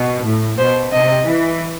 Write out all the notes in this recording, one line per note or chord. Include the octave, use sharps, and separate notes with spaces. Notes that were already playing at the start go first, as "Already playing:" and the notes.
Already playing: B2
A2
B2 C5
C3 D#5
E3